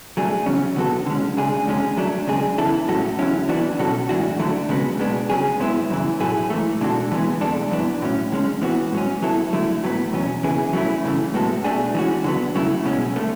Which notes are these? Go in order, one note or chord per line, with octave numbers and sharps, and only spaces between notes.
F#3 A3 D4 G#4
E2 C#3 F#3 C#4
D3 F#3 B3 F#4 A4
D3 G#3 C#4
C#3 G#3 D4 G#4
F#2 D3 G#3 C#4 G#4
F#3 A3 D4
C#3 G#3 D4 G#4
C#3 E3 B3 E4 A4
A2 F#3 C#4 F#4 A4
E2 D3 F#3 C#4 E4
E3 B3 D4 F#4
B2 F#3 C#4 F#4 A4
A2 E3 G#3 D4 F#4
D3 F#3 A3 D4
C#3 G#3 B3 F#4
B2 G#3 B3 D4
C#3 F#3 C#4 G#4
G#2 G#3 B3 E4
F#2 C#3 E3
A2 F#3 A3 E4 G#4
G#2 E3 A3
B2 G#3 D4 F#4 A4
E3 G#3 B3
E2 B2 G#3 D4 A4
F#2 E3 B3 D4
A2 F#3 C#4
D3 G#3 C#4
E3 B3 F#4
G#2 F#3 C#4
F#3 B3 E4 A4
D3 F#3 A3 E4
A2 F#3 B3
E2 B2 F#3 C#4
C#3 E3 B3 E4 G#4
F#3 A3 C#4 E4
F#2 C#3 E3 A3
A2 G#3 B3 F#4 A4
B2 A3 D4 G#4
E3 G#3 C#4 F#4
D3 F#3 B3
C#3 F#3 A3 E4
B2 G#3 C#4
D3 A3